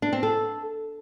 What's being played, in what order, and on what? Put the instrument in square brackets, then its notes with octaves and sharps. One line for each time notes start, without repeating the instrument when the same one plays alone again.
[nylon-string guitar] D4
C4
A4